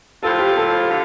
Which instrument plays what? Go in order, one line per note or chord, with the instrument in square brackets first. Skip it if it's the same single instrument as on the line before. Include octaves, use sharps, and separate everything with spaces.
[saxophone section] A2 F3 C4 F4 [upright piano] A4
[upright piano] G4
A4
[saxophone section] D3